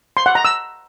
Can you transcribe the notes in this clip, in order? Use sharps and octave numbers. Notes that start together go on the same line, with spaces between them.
C6
F#5
A#5
E6